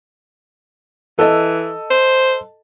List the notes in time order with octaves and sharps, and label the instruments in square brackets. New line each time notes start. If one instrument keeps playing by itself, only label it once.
[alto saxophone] E3 [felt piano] A4 D#5
[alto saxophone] C5